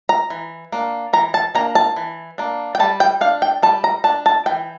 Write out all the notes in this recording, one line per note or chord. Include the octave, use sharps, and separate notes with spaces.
A#5
E3
A#3 D4
E3 A#5
A5
A#3 D4 A#5
A5
E3
A#3 D4
G5
G3 A5
G5
D4 F5
G5
G3 A5
A#5
D4 A5
A5
E3 G5